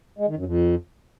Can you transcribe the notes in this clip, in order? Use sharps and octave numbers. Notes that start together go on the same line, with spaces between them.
G#3
D#3
F#2
F2